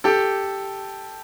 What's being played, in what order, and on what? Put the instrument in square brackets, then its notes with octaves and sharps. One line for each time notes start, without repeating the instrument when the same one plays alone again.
[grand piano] G4 A4